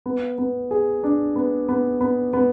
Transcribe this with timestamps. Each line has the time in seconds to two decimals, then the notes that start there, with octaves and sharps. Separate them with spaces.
0.06 B3
0.38 B3
0.71 G#4
1.03 D4
1.36 B3
1.69 B3
2.01 B3
2.33 B3